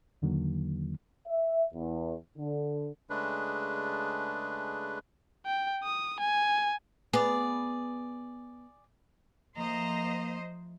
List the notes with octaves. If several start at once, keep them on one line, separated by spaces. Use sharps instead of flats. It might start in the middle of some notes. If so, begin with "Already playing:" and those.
E2 D3 D#3 F#3 A#3
E5
E2
D3
C#3 G#3 A3 D4 B4
G5
D#6
G#5
B3 G#4 D5
F3 A3 A#3 C5 D#5 A#5